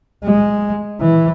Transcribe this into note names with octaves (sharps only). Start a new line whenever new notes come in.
G#3
E3